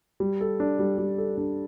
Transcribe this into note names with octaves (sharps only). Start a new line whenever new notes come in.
G3
A4
D4
G3
G3
A4
D4